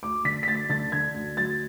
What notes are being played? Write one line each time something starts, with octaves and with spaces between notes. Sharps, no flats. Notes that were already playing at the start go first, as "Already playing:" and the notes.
D2 D6
D3 B6
B6
D2 A6
D3 A6
D3 G#6
D2
F#3 A6